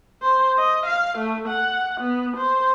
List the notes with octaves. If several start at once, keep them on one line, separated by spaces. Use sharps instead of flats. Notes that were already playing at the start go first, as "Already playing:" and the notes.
C5
D#5
F5
A3
F#5
B3
C5